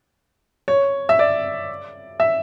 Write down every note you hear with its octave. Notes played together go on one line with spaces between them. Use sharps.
C#5
E5
D5
E5